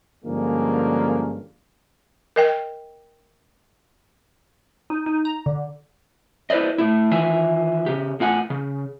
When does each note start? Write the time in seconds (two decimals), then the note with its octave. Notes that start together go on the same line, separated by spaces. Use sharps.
0.25 G2 D3 F3 G#3 A#3 C#4
2.36 A#4 D#5 G5
4.90 D#4
5.06 D#4
5.25 A#5
5.46 D3
6.50 E4 B4 C5 D5 D#5
6.78 A2 A3 E4
7.11 D#3 E3 F4 E5 G#5
7.86 C#3 G4
8.20 A2 F4 F#5 G#5
8.50 C#3